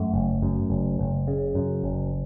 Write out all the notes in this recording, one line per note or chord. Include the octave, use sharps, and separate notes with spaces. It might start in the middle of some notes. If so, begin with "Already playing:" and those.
Already playing: F#2 A3
F#1
F#2
F#1
F#1
C#3
F#2
F#1